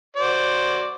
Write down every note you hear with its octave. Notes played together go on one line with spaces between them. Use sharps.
F#4 C5 D5